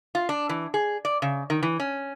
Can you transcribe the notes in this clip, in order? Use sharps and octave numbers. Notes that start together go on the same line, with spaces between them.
F4
D4
E3
G#4
D5
C#3
D#3
E3
C#4